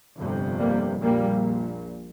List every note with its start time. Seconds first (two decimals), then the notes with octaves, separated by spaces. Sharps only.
0.17 G1 F2 C3
0.59 G3 A#3
1.01 A#1 A#2 G3 A#3